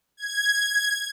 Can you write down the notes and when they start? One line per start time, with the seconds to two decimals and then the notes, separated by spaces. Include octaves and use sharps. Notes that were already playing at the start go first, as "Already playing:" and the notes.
0.17 G#6